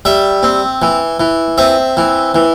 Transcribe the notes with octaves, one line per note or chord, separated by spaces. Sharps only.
G3 E5
C4
E3
E3
C4 E5
E3
E3